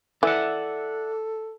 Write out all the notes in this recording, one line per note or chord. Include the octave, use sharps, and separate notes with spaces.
E3 A4 D5 E5 F#5